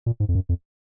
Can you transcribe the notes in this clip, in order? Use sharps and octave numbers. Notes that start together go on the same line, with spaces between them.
A#2
G#2
F2
F#2
F2